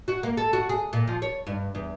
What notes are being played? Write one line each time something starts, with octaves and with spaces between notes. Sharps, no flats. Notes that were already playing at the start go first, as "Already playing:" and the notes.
F#4
A#3
A4
F#4
G#4
A#2
F3
C#5
G2
E2